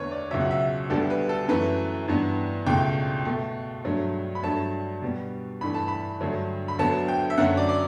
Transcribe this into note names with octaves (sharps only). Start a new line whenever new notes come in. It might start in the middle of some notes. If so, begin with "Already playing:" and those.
Already playing: E2 D3 A3 B4 C#5
D5
C#2 B2 F#3 E5
F#5
E5
D2 D3 G3 B3 A4
B4
A4
F#2 E3 A3 B4
G2 E3 B3
C#2 B2 A3 G5
B2 A3
G2 F#3 A3
B5
G2 F#3 A3 A5
B2 G3 B3
G2 E3 A3 B5
A5
B5
G2 D3 F#3 A3
B5
D2 D3 F#3 B3 A5
G5
E5
F#2 D3 F#3 A3 F#5
D5
D5